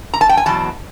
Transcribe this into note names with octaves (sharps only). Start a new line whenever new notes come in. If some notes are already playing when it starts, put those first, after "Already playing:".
A#5
A5
G5
G#5
E2 B2 F#3 A5